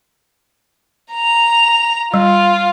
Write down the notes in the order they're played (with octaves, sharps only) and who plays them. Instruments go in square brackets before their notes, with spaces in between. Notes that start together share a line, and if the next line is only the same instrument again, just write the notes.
[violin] A#5 F7
[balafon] G3 [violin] F4